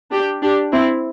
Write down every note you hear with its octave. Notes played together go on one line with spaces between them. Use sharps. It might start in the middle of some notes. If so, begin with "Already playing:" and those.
D4 G4
D4 G4
C4 E4